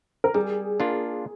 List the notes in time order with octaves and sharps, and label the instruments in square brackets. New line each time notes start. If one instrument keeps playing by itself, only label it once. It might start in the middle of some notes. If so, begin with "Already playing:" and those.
[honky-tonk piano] A#4
[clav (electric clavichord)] G3 [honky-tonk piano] G#4
[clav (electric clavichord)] A#3 D4 F4